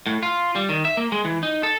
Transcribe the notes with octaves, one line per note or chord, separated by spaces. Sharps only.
A2
F4
G3
D#3
E5
A#3
G#3
E3
D#4
A4